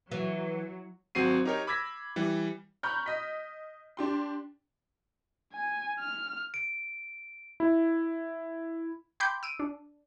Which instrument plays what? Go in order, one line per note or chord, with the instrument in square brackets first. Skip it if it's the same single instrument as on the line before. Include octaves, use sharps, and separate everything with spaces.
[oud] E3 [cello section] F#3
[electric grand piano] G#1 F#3 C4 F#4 C7 D#7
D#4 G4 A#4 C#5
B5 D6 E6 G#6 A#6 B6
E3 G3
[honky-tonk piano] A#5 B5 C#6 F6 G6
D#5 B6
D4 G4 C6
[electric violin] G#5
F6
[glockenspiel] D7
[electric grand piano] E4
[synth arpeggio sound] G5 B5 C6 D6 G6
E6 D7 D#7
D4